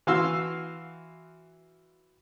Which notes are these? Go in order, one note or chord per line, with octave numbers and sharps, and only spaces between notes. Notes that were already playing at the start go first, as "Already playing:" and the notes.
E3 F#4 F5 C6 E6